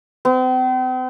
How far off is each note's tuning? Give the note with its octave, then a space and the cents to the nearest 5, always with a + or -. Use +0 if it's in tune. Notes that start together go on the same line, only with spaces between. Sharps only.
C4 -40